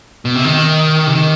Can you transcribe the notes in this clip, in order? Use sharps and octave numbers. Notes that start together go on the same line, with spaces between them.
B2
C3
D#3
C3
D#3